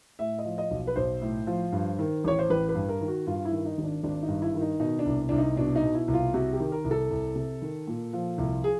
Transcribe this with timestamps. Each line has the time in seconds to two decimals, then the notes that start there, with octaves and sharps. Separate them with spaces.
0.19 A2 E5
0.38 D#5
0.45 F3
0.58 D#5
0.71 B1
0.87 B4
0.96 B1 C5
1.22 A2
1.47 F3
1.72 G2
1.99 D#3
2.24 A1 C#5
2.39 C5
2.50 A1 B4
2.69 B4
2.75 G2
2.89 A#4
3.01 D#3
3.08 F#4
3.27 G2 F4
3.45 E4
3.52 D#3
3.65 D#4
3.78 G#1
3.84 D4
4.03 G#1 D4
4.23 D#4
4.28 G2
4.42 E4
4.55 D#3
4.61 D#4
4.80 B2 D#4
4.99 D4
5.05 C2
5.29 C2 D4
5.38 D#4
5.57 B2 D4
5.76 D#4
5.83 B2
5.95 E4
6.08 C2
6.14 F4
6.34 C3 F#4
6.53 G4
6.60 D#3
6.72 A#4
6.84 C2
6.91 A4
7.11 C2
7.35 C3
7.62 D#3
7.87 A#2
8.13 F3
8.38 C2
8.64 G#4